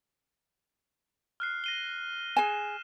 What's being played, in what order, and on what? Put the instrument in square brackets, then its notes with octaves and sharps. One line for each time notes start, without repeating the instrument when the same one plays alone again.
[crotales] F6 F#6 C7
A#6 D#7 G7
[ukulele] G#4 G#5 [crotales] E7